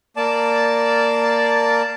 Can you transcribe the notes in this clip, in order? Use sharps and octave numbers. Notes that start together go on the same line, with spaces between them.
A#3 D5 A5